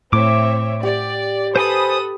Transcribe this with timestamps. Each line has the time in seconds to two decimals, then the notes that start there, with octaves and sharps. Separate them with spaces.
0.13 A2 C4 C#5 E5 D6
0.83 G4 D5
1.56 A4 B4 C5 G#5 B5 D#6